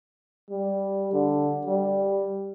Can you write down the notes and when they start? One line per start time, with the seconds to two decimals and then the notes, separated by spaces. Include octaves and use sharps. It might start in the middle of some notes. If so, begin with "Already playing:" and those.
0.51 G3
1.13 D3
1.66 G3